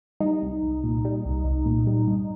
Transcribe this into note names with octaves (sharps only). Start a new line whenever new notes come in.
G3 D#4
C2
C2
A#2
G3
C2
C2
A#2
G3
G2